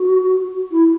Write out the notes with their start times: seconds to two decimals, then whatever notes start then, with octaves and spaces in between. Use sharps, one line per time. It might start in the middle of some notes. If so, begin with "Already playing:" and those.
Already playing: F#4
0.72 E4